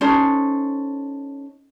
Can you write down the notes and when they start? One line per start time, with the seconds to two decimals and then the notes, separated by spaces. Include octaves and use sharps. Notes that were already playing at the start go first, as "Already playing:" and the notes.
0.01 C#4 D#4 A4 C5